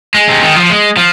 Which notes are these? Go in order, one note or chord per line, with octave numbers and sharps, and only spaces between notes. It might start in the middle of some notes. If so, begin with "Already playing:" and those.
G#3
C3
D#3
F3
G#3
F3